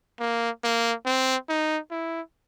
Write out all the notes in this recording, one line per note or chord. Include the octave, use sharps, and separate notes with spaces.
A#3
A#3
C4
D#4
E4